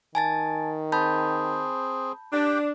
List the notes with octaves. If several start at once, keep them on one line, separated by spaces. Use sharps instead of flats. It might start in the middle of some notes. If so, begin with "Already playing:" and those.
D#3 G#5 A5 A6
C4 G#4 A5 B5 G6
D4 G4 G5